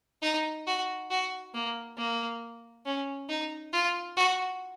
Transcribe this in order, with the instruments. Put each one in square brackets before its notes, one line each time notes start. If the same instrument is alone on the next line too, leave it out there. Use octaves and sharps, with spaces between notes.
[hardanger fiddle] D#4
F#4
F#4
A#3
A#3
C#4
D#4
F4
F#4